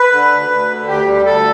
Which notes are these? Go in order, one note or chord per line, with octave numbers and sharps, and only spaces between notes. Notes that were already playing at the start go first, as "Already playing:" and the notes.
Already playing: B4
D3
D2
D2
D3
D2 G4
G3
D2 A4